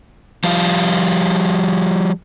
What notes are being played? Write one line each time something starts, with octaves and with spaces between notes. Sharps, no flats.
F3 G3 F5